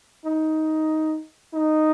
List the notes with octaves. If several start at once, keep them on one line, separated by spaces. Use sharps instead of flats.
D#4
D#4